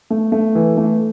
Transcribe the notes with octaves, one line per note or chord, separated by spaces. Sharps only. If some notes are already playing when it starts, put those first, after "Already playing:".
A3
A3
E3
A3